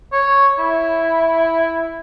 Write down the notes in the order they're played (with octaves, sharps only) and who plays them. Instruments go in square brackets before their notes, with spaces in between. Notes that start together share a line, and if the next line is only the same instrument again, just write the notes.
[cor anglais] C#5
E4